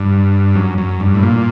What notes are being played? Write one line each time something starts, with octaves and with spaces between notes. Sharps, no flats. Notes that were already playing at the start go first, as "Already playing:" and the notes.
Already playing: G2
F#2
F#2
G2
A2
A#2